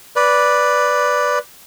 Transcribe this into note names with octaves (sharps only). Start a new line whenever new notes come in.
B4 D5